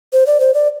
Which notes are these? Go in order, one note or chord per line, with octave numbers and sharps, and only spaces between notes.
C5
D5
C5
D5